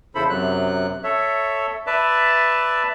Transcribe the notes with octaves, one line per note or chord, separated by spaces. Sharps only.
E2 C#3 E4 A4 C5 B5
F#2 C3 F#3 F#6
A4 C#5 E5
B4 D5 E5 A5